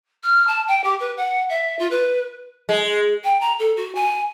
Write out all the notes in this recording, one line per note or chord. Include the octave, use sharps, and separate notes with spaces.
F6
A5
G5
G4
B4
F#5
E5
F4
B4
G#3
G5
A#5
A4
F#4
G#5